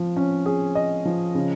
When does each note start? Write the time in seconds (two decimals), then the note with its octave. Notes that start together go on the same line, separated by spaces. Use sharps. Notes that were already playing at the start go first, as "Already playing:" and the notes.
Already playing: F3
0.17 C#4
0.46 G#4
0.75 D#5
1.05 F3
1.35 C#3